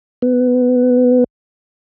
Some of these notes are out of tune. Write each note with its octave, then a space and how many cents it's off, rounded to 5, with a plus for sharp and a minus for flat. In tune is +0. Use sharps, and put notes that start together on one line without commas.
B3 +15